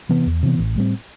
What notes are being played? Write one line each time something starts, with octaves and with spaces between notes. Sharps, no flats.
C3 E3 B3
E2
C3 E3 B3
A1
A2 G3 C4